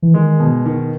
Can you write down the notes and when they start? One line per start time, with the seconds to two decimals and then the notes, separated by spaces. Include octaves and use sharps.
0.02 E3
0.14 D#3 G#3
0.40 B2
0.66 D#3